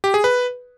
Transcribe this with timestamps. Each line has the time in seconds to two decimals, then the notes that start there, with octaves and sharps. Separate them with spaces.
0.04 G4
0.14 G#4
0.24 B4